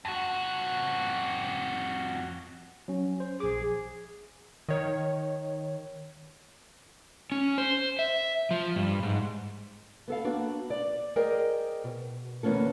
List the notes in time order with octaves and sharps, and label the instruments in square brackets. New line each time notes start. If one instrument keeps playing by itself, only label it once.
[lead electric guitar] F2 F#4
[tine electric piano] F#3 C#4
C5
[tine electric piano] A#1 D6 [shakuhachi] G#4
[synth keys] D#3 C#5
[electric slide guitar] C#4
C5
E5
F3
G2
G#2
[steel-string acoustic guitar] B3 A4 F5
A#3 B3 D4 F#4
D5
G#4 A#4 C5 D5 D#5 G5
B2
D2 E3 A#3 B3 C#4 A4